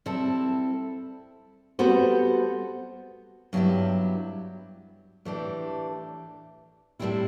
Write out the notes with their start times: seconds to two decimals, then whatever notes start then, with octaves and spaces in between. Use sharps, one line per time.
0.06 G3 C4 E4 A4
1.79 G3 B3 F#4 A4 C5
3.53 G2 F#3 B3 E4 G4
5.25 A2 E3 A3 D4 G4
6.99 A2 G3 C4 E4